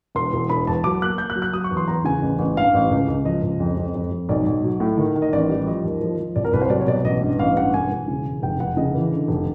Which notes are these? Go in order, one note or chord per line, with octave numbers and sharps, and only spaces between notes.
E1 C6
E1
E1 B5
E2 A5
F#3 D6
A#3 F#6
A#3 G6
F#6
F#3
F#6
F#3 D#6
C#6
E2
C6
E2 A#5
C#3 G#5
A1
A1
G2 F5
A1
C#2
C#2
F3 D#5
C#2
F2
F2
F2
F2
B1 D5
B1
F#3
A2
D#3
D#3
D#5
A1 D5
G3
F3 D#5
D#2
F3
F3
C2 D5
A#4
C2 B4
C5
F#3 D5
C#5
B2 D5
A1 D#5
G2
A1 F5
G2 F#5
E1 G#5
E1
C#3
E1
F1 G5
F1 F#5
C#3 D#5
E3
D3
F1